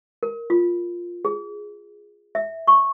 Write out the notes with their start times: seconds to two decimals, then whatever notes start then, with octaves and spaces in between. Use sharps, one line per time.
0.23 A#4
0.50 F4
1.25 G#4
2.35 E5
2.67 C#6